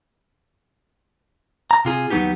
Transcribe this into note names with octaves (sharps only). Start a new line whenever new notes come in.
A#5
C3 F4 G#4
D#2 F#3 A#3 B3 D#4 G4